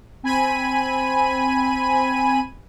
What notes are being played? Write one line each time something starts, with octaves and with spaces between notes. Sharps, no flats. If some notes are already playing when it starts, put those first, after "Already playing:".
C4 G#5 B5 D#7